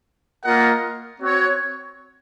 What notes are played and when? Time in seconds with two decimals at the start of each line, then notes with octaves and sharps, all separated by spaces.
0.43 A#3 F4 A#4 D#5 F#5
1.20 C4 F#4 C#5